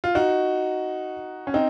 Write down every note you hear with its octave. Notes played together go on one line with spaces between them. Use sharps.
F4
D#4 F#4
C#4
C4 D#4